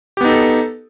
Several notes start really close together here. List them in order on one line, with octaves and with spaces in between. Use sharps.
G4 B3 D#4 A4